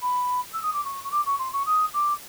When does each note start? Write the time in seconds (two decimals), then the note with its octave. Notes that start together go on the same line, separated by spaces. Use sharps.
0.01 B5
0.53 E6
0.62 D#6
0.73 D6
0.84 C#6
1.04 C#6
1.11 D6
1.26 C#6
1.39 C6
1.53 C#6
1.66 D#6
1.93 D6